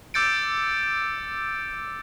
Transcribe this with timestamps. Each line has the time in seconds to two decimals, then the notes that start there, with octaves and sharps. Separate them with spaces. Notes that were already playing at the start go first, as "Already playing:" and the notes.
0.14 D6 E6 G6 A6 C#7 D7